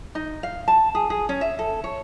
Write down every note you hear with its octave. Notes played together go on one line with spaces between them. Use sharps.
D#4
F5
A5
G#4
G#4
C#4
E5
A4
C#5